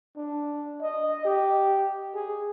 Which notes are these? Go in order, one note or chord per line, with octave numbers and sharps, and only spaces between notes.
D4
D#5
G4
G#4